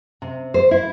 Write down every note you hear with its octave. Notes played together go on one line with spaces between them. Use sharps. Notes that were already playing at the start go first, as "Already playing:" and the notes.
C3
C5
E4